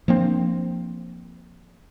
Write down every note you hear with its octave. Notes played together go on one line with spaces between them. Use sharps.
F3 A#3 C4 D4